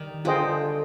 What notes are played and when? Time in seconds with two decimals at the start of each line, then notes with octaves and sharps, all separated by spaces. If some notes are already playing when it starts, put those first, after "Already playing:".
Already playing: D#3 G3
0.25 D3 F4 G#4 C5 D#5 G5